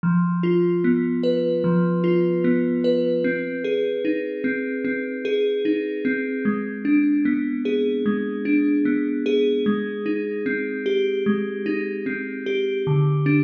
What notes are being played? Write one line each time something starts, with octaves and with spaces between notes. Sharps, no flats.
F3
F4
B3
B4
F3
F4
B3
B4
C4
G#4
D#4
C4
C4
G#4
D#4
C4
G#3
D4
B3
G#4
G#3
D4
B3
G#4
G#3
D#4
C4
G4
G#3
D#4
C4
G4
D3
D4